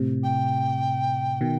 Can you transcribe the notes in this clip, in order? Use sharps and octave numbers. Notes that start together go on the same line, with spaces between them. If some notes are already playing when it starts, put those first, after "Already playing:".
Already playing: A2 C3
G5
B2 D#3